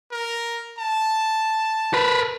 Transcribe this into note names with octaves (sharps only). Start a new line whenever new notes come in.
A#4
A5
A#4 B4